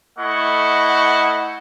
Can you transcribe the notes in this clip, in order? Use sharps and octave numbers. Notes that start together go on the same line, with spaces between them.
A3 E4 D#5 F#5 C#6